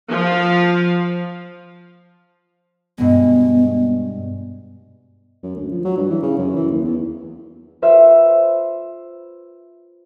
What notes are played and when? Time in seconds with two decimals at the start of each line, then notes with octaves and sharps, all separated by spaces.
0.10 F3 F5
2.98 G2 B2 G#3 B3
5.43 F#2
5.56 D2
5.71 F3
5.85 F#3
5.97 G2
6.10 E3
6.22 C#3
6.38 F#2
6.56 E3
6.70 D#2
6.84 E2
7.82 F4 B4 C5 E5